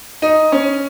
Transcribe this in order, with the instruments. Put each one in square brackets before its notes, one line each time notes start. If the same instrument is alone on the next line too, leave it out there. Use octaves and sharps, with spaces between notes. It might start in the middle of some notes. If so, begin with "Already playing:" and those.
[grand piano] D#4
C#4